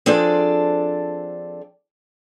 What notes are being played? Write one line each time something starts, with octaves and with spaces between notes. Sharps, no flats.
F3 C4 D4 G#4 A4 D5